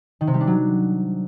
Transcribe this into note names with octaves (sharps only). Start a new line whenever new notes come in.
D#3
C3
G3
D4
F#3